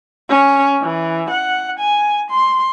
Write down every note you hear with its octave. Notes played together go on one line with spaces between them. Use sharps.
C#4
E3
F#5
G#5
C6